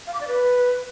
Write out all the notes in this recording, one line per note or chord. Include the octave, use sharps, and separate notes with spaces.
F5
D6
D5
B4